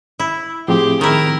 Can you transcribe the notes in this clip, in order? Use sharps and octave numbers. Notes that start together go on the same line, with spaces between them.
E4
A2 F3 C4 G4 G#4
D#3 E4 A#4